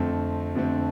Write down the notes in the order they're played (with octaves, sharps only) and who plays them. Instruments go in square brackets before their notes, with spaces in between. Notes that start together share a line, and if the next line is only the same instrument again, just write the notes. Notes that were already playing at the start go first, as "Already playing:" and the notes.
Already playing: [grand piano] F2 D3 A3 C4
F2 D3 A3 C4